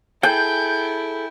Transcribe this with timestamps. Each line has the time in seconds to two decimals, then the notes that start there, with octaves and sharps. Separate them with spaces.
0.23 E4 G#4 A4 G5 G6